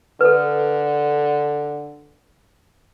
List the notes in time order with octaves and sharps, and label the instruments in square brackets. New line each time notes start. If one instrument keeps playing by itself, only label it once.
[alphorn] D3 [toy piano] A4 B4